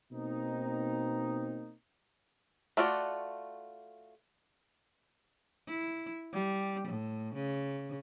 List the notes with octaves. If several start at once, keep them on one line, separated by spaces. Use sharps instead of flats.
B2 A#3 C4 D#4
A3 F4 F#4 D5
E4
G3
A2
C#3